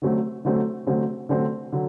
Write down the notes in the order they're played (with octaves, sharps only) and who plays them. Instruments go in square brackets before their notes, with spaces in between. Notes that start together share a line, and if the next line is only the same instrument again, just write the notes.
[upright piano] D3 F#3 A3 C4
D3 F#3 A3 C4
D3 F#3 A3 C4
D3 F#3 A3 C4
D3 F#3